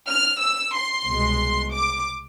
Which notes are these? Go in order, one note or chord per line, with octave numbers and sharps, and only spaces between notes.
F6
E6
C6
C2 B2 G#3
D6